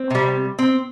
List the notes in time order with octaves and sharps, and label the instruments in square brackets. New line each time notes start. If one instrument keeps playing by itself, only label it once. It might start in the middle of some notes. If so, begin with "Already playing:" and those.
Already playing: [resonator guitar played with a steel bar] C4
C3 G3
C4